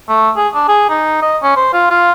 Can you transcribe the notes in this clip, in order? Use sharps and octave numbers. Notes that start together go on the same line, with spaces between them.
A3
G#4
D4
G#4
D#4
D#5
C#4
C5
F4
F4